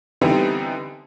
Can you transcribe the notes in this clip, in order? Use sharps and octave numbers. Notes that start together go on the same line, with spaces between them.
D3 E3 G3 B3 C4 D#4